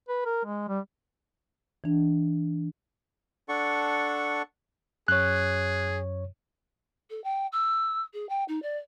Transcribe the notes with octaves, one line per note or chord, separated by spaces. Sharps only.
B4
A#4
G#3
G3
E3 D4
D4 A4 F#5 C#6
F#2 G#4 C#5 F#6
A4
G5
E6
G#4
G5
D#4
D5